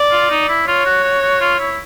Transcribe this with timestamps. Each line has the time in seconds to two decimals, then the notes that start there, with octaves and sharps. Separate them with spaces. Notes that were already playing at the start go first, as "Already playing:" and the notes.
Already playing: D5
0.11 F4
0.30 D#4
0.49 E4
0.67 F4 C#5
0.85 F#4
1.04 F#4
1.22 F#4
1.40 F4
1.59 E4